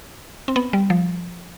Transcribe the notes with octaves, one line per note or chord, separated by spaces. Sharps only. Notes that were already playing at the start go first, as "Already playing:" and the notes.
C4
B3
G3
F3